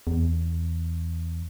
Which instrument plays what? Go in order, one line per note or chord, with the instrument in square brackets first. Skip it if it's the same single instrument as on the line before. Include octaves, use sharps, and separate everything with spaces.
[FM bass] E2